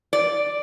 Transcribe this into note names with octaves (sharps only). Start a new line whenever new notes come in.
D5